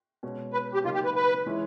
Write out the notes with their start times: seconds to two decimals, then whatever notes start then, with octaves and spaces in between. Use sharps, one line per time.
0.23 B2 G#3 C#4
0.53 B4
0.74 G4
0.84 C#3 F#3 A#3 D#4 F4
0.94 G4
1.05 B4
1.15 B4
1.46 E3 G#3 C#4 E4